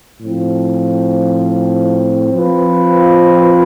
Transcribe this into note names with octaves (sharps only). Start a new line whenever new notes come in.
A2 F3 C4
F3 C4 F4 B4